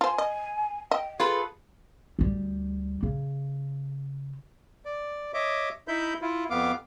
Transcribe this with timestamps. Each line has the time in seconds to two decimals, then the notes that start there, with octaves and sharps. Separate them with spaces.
0.01 F4 C5 G#5
0.18 D#5
0.91 D#5 G5
1.20 F4 G#4 A4 B4
2.19 D2 G3
3.03 C#3
4.85 D5
5.34 C#5 D#5 E5 D6
5.88 D#4 E4 E5 B5 G6
6.21 E4 F4
6.50 F2 B3 F5 D6